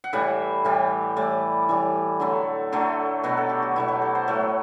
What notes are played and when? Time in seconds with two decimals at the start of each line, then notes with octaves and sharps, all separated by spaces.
0.04 F#5
0.13 A2 E3 G3 E5
0.65 A2 E3 G3
1.16 A2 E3 G3 D5
1.69 A2 E3 G3
2.20 D3 F#3 A3
2.72 D3 F#3 A3
3.23 B2 F#3 A3 B4
3.37 A4
3.49 G4
3.62 F#4
3.76 B2 F#3 A3 E4
3.88 G4
4.02 A4
4.15 C5
4.27 A2 F#3 A3 B4